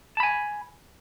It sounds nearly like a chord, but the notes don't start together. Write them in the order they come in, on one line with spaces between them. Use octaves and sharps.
A5 B5 G#5